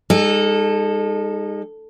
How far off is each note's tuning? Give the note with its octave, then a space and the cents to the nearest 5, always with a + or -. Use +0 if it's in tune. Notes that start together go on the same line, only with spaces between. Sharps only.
G#3 -35 D#4 +0 A4 +0